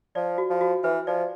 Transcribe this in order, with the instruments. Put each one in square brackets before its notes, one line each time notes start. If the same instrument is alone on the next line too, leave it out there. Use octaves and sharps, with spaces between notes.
[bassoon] F3 [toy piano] D5
[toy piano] F#4
[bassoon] F3
[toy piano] F#4
[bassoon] E3 [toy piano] B4
[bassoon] F3 [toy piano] D5